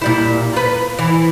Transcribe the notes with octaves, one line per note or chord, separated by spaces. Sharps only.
A#2 G3 E4
F4 B4
E3